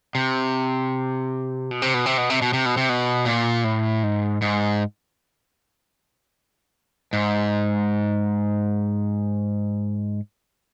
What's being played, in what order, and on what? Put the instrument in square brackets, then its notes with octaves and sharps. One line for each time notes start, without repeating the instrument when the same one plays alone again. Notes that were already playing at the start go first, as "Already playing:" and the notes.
[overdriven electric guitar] C3
B2
C3
B2
C3
B2
C3
B2
C3
B2
C3
B2
A#2
A2
G#2
G#2
G#2